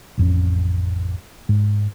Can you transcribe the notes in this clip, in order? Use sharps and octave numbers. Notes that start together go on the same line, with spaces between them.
A1 F2 B3 C#4
G#2